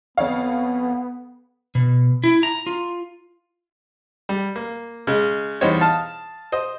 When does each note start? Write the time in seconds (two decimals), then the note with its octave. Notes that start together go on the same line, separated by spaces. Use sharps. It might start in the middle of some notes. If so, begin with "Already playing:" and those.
0.17 F2 B3 C#5 F5
1.75 B2
2.24 E4
2.43 A#5
2.67 F4
4.29 G3
4.56 A#3
5.07 C#3 G#3
5.61 E2 G3 D#4 C5 C#5
5.81 F5 A5 D#6
6.52 C5 D#5